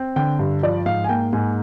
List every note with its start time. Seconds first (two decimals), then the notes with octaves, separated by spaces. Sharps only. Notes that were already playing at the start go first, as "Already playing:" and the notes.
Already playing: C4
0.16 D3 G5
0.39 G2
0.63 F3 D5
0.86 G#2 F5
1.04 G#5
1.09 A#3 G5
1.33 G#2 G#5